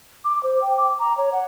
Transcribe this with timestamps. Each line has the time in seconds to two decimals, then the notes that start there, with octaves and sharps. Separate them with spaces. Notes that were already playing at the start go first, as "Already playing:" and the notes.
0.24 D6
0.43 C5
0.62 G5
0.77 D6
0.99 A#5
1.17 C#5
1.32 F#5